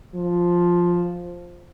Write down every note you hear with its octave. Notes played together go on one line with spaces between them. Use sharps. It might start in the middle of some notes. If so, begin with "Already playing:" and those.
F3